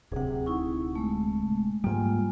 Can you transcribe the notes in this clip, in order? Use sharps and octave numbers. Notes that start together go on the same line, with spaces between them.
D1 C3 G#4 F#5
D#4 E4 C#6
G#3 A3
G#2 G3 A#3 F4 G#5